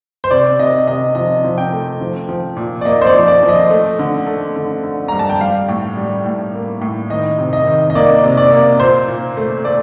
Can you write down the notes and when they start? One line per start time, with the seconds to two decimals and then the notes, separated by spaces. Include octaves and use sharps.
0.24 C5
0.31 C3 D5
0.59 C3 D#5
0.87 C3 D#5
1.15 F3 D#5
1.44 F3
1.58 G5
1.73 A3
2.01 F3
2.29 F3
2.57 A#2
2.81 D5
2.85 A#3 D#5
3.01 C5
3.06 D5
3.14 F3
3.28 D5
3.43 F3
3.49 D#5
3.70 A3
3.99 D3
4.26 A3
4.56 D3
4.83 D3
5.08 G2 A#5
5.19 A5
5.29 G5
5.41 G3 F5
5.69 A2
5.97 G3
6.26 A2
6.54 A#3
6.81 A2
7.10 D#3 D#5
7.38 C3
7.53 D#5
7.67 D#3
7.90 D#5
7.95 A#3 D5
8.23 C3
8.37 D5
8.52 A#3
8.80 A#2 C5
9.08 A#2
9.37 A3
9.65 A3 D5